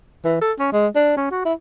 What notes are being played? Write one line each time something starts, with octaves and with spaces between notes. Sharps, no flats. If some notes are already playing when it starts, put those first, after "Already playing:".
E3
A4
C#4
G#3
D4
C#4
F#4
E4